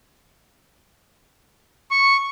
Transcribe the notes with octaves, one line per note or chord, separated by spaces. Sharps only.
C#6